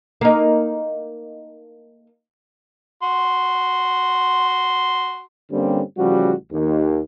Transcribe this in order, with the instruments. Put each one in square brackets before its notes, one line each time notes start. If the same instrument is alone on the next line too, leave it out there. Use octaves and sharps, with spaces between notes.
[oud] A#3 D#4
[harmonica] F#4 C6
[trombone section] G2 D3 G3 A#3 C4 C#4
A1 C#3 F3 G3 F#4
D#2